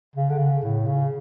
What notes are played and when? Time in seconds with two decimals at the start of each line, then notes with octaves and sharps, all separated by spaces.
0.16 C#3
0.29 D3
0.39 C#3
0.63 A2
0.86 C#3